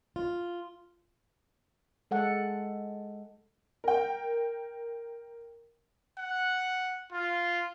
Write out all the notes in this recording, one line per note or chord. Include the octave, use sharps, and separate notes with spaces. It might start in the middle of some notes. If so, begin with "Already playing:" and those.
F4
G#3 A4 F#5
A#4 G5
F#5
F4